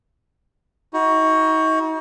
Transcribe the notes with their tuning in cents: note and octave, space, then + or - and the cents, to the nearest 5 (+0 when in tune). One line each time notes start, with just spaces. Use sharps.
D#4 +40 F#4 +0